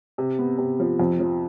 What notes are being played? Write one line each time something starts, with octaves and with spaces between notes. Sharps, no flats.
C3
B3
C3
F3
F2
F3